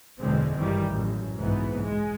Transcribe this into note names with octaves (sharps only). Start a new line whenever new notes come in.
F#1 E2 B2 D3 G#3 C4
G#1 G2 D#3 E3 G3
A1 F#2
F#1 B1 G#2 E3 B3
G#3